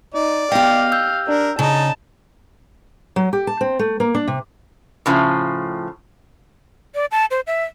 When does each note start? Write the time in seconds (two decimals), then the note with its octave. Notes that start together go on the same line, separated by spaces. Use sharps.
0.14 D#4 D5
0.52 B3 G4 D#5 F5 G5
0.92 E6 G6
1.28 D4 A#4
1.59 C#3 D#4 A5
3.16 F#3
3.33 G4
3.47 A5
3.61 C4
3.79 A3
4.00 A#3
4.15 D4
4.28 C3
5.06 A2 C#3 F3
6.95 D5
7.11 A5
7.31 C5
7.47 E5